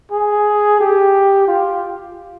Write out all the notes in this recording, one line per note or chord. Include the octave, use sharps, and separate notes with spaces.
G#4
G4
F4